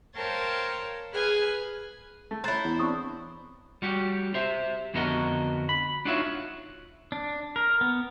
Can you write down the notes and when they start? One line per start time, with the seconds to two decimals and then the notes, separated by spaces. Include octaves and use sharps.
0.16 A#4 C5 C#5 F5 G5 A5
1.13 G#4 B4 G#5 F6
2.31 A3
2.44 E4 C5 C#5 A#5 F#6 A6
2.64 E2
2.79 C4 D4 C#6 D#6
3.82 G3 F#4 G4
4.34 G4 C5 E5
4.94 F2 D3 B3 F#4 A#4 D#5
5.69 B5
6.05 D4 D#4 F4 F#4 C#5 E5
7.12 D4
7.56 A#4
7.81 B3